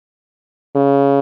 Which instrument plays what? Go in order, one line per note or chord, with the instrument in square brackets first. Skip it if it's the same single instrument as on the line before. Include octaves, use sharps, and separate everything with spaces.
[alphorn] C#3